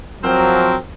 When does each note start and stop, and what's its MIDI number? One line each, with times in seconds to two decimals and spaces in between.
0.24 0.76 53
0.24 0.76 54
0.24 0.76 60
0.24 0.76 70